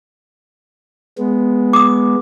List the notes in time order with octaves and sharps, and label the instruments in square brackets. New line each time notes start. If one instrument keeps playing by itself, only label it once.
[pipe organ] G#3 B3
[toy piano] D6 D#6